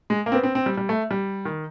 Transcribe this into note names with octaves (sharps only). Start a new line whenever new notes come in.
G#3
A#3
C4
B3
C4
C4
G3
G3
A3
G3
D#3